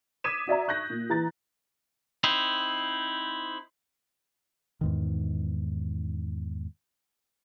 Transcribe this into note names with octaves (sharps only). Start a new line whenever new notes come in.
D6 D#6 G#6 B6 D#7 E7
F#4 D5 E5 A#5
C#6 F#6 G6 A#6
A#2
E3 A#5 A6
C4 D#4 E4
E2 G#2 D#3